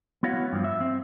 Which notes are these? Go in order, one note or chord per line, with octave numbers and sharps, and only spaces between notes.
B3 E4 F#4 C#5 F5
G2 F3
E5
C4